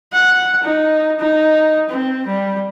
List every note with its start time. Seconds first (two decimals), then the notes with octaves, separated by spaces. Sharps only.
0.13 F#5
0.63 D#4
1.20 D#4
1.90 C4
2.27 G3